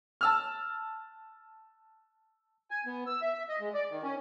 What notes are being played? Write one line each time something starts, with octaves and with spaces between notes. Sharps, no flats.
A5 E6 F6
G#5
B3
E6
E5
E5
D#5
G#3
D5
D#3
C#4